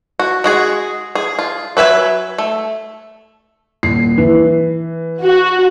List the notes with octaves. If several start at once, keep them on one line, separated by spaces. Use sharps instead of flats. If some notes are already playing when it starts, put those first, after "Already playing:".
F#4
G#3 F#4 G#4
G#4
F4
F#3 B4 E5 G#5
A3
D#1 C7
E3
F#4